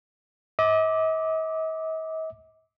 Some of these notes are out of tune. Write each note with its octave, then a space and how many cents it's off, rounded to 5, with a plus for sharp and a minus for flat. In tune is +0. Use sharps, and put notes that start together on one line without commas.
D#5 +45 D6 +0